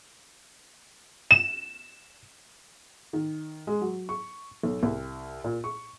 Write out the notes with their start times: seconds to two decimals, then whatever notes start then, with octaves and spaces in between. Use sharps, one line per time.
1.31 E7
3.13 D#3
3.67 G#3
3.81 F#3
4.09 C#6
4.63 B1
4.83 C2
5.44 A#2
5.64 C#6